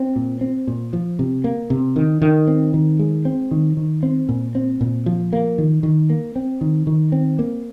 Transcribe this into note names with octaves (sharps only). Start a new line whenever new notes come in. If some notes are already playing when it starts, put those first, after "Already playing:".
Already playing: C4
A#2
C4
A#2
F3
C3
A#3
C3
D#3
D#3
C4
D#3
G#3
C4
D#3
D#3
C4
A#2
C4
A#2
F3
A#3
D#3
D#3
A#3
C4
D#3
D#3
C4
A#3